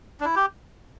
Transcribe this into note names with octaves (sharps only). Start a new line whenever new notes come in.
D4
E4
G4